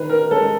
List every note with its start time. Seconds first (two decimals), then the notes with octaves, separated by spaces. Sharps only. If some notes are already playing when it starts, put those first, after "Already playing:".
Already playing: D#3 B4
0.09 A#4
0.31 G#3 A4